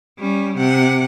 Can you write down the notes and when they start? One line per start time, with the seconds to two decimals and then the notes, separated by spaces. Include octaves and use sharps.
0.19 G3 C#4
0.58 C3 F#5